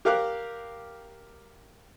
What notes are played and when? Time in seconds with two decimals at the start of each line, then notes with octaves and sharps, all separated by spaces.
0.05 G4 A#4 F5 D6 F#6